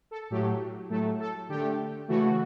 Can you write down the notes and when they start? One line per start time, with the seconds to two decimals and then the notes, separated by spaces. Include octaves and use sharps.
0.11 A4
0.30 A2 F#3 A3 G4
0.89 A2 F#3 A3 A4
1.20 A4
1.49 D3 A3 G4
2.08 C#3 E3 A3 F#4